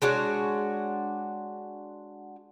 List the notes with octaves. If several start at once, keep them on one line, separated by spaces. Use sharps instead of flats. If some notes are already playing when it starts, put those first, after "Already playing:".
G#3 D4 F#4 C#5